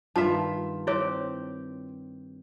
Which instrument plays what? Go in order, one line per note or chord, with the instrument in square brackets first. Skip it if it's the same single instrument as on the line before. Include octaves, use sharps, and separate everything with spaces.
[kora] G2 D#3 [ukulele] F4 E5 [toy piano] A5
[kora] C4 G4 [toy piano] E4 C#5